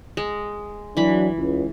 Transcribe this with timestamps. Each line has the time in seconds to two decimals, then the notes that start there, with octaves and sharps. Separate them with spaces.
0.17 G#3
0.97 E3 F#3 D4 B5
1.38 C#2